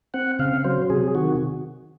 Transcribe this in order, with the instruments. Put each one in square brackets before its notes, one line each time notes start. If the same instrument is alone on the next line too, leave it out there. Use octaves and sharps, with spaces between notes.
[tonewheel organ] C4 F#5
C#3 F5
F#3 C5
C3 G#4
D#3 F#4